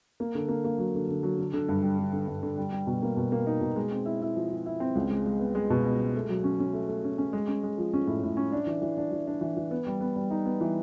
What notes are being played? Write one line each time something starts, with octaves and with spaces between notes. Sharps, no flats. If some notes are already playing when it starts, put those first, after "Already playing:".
A#3
D3
A#3
A#3
F#3
D3
D3
F#3
D3
D3
G2
G3
D3
D3
G2
D3
G3
G3
B2
A#3
B2
A#3
D#4
B2
G#3
C4
E4
E4
F3
F3
E4
C4
C#2
G#3
G#3
B3
G#3
B2
B3
G#3
A3
F#3
C#4
C#4
A3
A3
C#4
C#4
G#3
C#4
G#3
F3
C#4
A2
A2
C#4
D4
E3
E3
D4
E3
D4
E3
E3
B3
G3
B3
G3
D#4
B3
E3